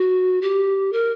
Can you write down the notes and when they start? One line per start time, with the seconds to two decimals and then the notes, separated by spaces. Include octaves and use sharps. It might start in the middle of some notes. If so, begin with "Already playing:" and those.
Already playing: F#4
0.42 G4
0.93 A#4